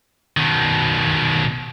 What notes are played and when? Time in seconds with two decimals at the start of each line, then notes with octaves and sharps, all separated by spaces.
0.37 B2 D#3